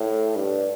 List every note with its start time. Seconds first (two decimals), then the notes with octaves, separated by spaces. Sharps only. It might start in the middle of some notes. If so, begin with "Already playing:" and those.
Already playing: A2
0.35 G2